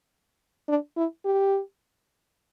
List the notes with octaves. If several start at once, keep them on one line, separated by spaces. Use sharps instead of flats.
D4
E4
G4